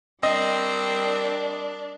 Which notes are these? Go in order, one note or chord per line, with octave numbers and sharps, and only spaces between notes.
G3 C4 D4 A#4 D#5